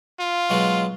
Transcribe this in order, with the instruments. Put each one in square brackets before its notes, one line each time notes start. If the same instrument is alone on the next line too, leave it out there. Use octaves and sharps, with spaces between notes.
[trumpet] F4
[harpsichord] B2 F#3 G#3